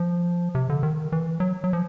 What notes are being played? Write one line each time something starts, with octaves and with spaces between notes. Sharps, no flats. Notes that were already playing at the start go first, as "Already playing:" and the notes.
Already playing: F3
C3
D3
D#3
E3
F#3
F#3
F3